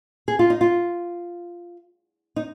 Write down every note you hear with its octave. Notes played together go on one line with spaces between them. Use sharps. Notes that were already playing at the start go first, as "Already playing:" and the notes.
G#4
F4
D#4
F4
D#4